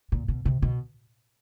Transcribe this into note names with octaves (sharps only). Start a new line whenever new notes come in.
A#2
B2
C3
B2